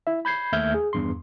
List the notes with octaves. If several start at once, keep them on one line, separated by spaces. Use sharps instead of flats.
E4 E5
B5 G6 G#6 C7
D#2 A3 E5 F6 G6 G#6
G#4
E2 G2 C6